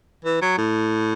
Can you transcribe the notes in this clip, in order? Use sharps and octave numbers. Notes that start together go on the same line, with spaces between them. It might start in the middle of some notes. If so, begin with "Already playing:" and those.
E3
F#3
A2